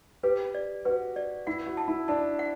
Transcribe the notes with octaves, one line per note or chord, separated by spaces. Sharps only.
G4 B4
D5
F#4 B4
D5
E4 F#5
F#4
A5
E4
D4 A5
F#5